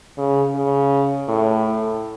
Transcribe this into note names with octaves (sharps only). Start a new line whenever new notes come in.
C#3
C#3
A2